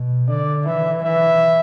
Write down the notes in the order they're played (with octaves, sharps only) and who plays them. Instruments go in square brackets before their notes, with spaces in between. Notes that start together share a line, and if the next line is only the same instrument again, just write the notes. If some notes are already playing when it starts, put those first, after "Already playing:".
Already playing: [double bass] B2
[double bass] D3 [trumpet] D5
[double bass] E3 [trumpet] E5
[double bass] E3 [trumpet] E5